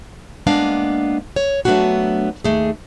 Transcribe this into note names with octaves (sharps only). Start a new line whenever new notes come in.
G#3 A#3 B3 D4 F5
C#5
F#3 A3 B3 C#4 D4 F#4
D#2 A3 G#4